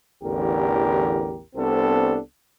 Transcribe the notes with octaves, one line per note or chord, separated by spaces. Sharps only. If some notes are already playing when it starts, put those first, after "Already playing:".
A1 E2 D3 G4 A#4
C2 B3 C4 D4 A4